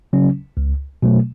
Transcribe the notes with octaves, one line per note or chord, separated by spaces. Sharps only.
C#3 F#3 C#4
C#2
B2 F#3 A3